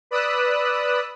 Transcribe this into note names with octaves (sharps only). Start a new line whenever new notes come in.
B4 D5 B5 D#6 E6 F#6